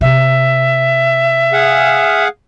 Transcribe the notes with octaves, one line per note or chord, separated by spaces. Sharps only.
C3 E5
G#4 F5 F#5